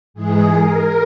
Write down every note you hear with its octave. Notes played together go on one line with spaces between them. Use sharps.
G#2 E3 G#3 G#4
A#4